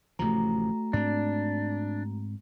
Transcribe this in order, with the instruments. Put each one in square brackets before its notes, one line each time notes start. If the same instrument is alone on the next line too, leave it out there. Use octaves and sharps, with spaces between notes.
[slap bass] A1 C3 F3 [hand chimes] A3 F#4 A#5
[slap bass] G#2 C4 [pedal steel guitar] D4